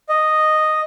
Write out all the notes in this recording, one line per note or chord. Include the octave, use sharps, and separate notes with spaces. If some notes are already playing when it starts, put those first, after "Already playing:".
D#5